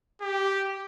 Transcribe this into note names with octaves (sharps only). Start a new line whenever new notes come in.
G4